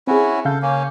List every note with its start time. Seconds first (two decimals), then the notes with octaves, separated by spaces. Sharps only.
0.07 C4 C#4 E4 F#4 G#4
0.45 C#3 A4 F5 G6
0.62 A#3 C#4